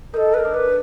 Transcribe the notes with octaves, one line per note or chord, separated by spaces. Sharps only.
D#4 A4 A#4
B4
A#4
D4
B4